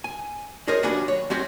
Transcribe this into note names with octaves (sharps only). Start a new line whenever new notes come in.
G#5
F#4 G#4 A#4 C5 C#5 D#5
D#2 F#3 D4 F#4 G#5 B5
C#5
F#3 C4 C#4 F#4 G4